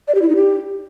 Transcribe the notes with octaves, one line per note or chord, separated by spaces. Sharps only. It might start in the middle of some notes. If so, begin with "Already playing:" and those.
D5
G4
E4
D#4
G4